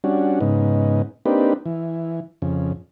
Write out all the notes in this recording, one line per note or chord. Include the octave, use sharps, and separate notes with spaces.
G3 C#4 D4 F#4
G#2 C#3 B3 D#4
A#3 C4 D4 D#4 G4 B4
E3
F2 C#3